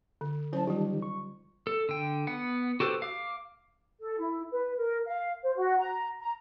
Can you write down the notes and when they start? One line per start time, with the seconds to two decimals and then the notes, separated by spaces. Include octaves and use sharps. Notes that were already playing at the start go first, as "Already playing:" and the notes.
0.21 D3
0.53 F#3 C#4 E4 C5 A5
0.67 D#3 G3 D#4 F4 G4
1.02 C#6
1.67 A4
1.89 D3 G5
2.27 B3 F#5
2.80 F#4 G4 A4 B4 C5
3.02 F5 D6
4.00 A4
4.19 E4
4.52 B4
4.78 A#4
5.06 F5
5.43 C5
5.56 F#4
5.79 A#5
6.20 A#5